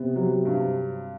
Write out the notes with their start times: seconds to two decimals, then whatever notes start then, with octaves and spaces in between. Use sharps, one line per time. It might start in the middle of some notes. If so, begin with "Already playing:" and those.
Already playing: C3 B3
0.16 F#3
0.45 G2